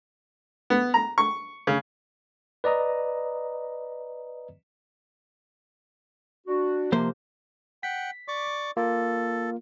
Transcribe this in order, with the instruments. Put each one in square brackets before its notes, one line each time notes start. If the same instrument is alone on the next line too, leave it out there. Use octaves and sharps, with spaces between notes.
[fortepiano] B3
A#5
C#6
C#3
[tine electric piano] B4 D5 D#5 A#5 D#6
[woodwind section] D4 F#4
[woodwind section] C3 [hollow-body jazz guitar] F3 A#3 C5
[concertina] F#5 G5 [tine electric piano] B6
[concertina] D5 C#6 D6
[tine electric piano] A#3 F4 [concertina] A4